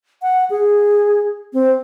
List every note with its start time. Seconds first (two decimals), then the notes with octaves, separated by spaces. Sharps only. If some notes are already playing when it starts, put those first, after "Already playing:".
0.22 F#5
0.50 G#4
1.53 C4